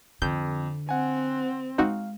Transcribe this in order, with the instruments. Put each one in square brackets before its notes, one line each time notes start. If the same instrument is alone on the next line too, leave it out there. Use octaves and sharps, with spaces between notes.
[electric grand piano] F2 [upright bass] D3 [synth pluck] G6
[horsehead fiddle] C4 [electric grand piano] F#5 G#5
[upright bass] G#3 [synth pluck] C4 D#4 F#4 [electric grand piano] F5